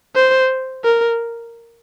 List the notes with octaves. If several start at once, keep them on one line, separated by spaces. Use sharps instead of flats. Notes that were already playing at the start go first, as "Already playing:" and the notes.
C5
A#4